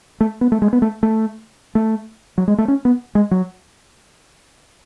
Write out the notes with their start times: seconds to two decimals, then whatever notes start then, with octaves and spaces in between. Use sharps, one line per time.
0.20 A3
0.41 B3
0.52 A3
0.62 G#3
0.73 B3
0.82 A3
1.03 A3
1.75 A3
2.38 F#3
2.48 G#3
2.58 A3
2.68 C#4
2.85 B3
3.15 G#3
3.31 F#3